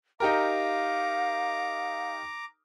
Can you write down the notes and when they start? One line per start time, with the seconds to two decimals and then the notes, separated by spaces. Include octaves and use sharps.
0.20 D#4 G4 A#4 F5 A#5 D6